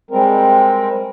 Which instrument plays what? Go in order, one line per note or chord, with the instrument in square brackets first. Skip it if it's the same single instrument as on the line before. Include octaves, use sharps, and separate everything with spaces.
[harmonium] G3 G#3 C4 A#4